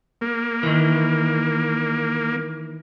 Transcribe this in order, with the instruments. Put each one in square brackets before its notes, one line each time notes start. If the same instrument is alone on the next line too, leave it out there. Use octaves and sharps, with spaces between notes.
[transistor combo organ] A#3
[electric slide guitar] D#3 E3